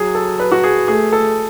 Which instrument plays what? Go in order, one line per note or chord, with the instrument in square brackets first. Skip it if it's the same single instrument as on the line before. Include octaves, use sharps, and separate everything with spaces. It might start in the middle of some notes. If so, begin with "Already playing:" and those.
Already playing: [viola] F#3 [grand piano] G#4
[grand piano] A4
B4
F#4
G#4
[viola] A3 [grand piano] G#4
[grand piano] A4